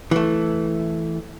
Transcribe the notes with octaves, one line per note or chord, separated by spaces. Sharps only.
E3 A3